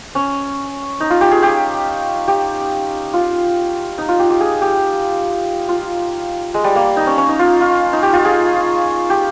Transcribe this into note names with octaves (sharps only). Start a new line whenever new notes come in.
C#4
D#4
F4
G4
G#4
G4
G4
F4
D#4
F4
G4
G4
G#4
G4
F4
G#3
G3
A#3
D#4
C#4
C#4
D#4
F4
F4
D#4
G4
F4
G#4
G4